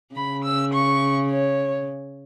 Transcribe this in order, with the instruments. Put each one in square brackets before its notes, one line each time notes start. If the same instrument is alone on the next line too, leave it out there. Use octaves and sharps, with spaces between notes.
[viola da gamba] C#3 [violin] B5
[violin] E6
C#6
C#5